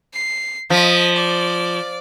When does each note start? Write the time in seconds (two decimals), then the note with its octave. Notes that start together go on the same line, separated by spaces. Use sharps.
0.14 C7
0.70 F3 D#5 B6
1.15 D5